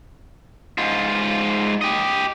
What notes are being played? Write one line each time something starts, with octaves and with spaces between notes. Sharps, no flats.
G#2 F4
G4 D#5